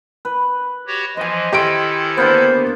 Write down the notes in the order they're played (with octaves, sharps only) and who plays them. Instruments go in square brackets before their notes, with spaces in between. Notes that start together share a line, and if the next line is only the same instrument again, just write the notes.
[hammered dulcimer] B4
[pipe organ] F#4 G4 C#5
[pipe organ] E3 F3 [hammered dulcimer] C5 G#5 [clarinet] D#5
[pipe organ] D#3 E4 A4 [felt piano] G4 C6 D7
[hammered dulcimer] D3 A#3 B3 [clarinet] C5